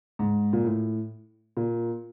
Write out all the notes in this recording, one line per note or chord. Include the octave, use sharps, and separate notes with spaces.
G#2
A#2
A2
A#2